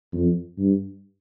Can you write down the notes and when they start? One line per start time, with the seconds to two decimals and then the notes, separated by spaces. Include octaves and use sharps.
0.13 F2
0.58 G2